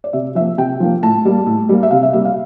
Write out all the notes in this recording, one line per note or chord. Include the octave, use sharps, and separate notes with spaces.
D5
C3 E5
F3 A#3 E5
C3 G5
F3 A#3
A2 A5
G3 A#3
A2
G3 A#3
E5
C3 F5
E5
G3 A#3 E5
F5